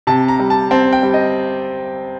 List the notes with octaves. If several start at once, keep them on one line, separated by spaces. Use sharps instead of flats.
C3 A5
A#5
G3
A5
C4 A5
G5
G3
D#5